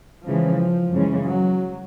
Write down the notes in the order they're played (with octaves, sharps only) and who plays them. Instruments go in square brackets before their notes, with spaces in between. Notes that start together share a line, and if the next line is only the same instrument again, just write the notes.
[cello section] C#3 E3 G#3 [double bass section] F3
[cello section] F#2 C#3 E3 G#3 C#4
[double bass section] F#3